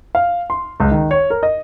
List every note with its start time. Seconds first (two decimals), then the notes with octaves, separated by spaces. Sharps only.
0.15 F5
0.50 C6
0.80 C#2
0.91 D#3
1.11 C#5
1.30 A#4
1.43 D#5